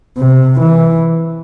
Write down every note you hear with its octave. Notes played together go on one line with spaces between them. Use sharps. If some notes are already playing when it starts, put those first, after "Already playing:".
C3
E3